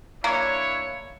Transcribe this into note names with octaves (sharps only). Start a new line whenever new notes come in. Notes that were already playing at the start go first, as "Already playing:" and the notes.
A#3 D4 E4 C#5